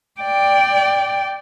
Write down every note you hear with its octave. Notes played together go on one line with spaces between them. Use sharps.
D5 G5